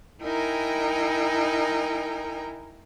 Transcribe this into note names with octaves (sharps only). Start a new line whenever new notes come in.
D#4 E4 A#4 G5 G#5 A#5